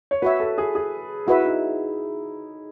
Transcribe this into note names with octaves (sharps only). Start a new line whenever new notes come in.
C#5
F#4 B4 C#5 E5
A4
G#4
G#4
E4 F#4 B4 E5
D#4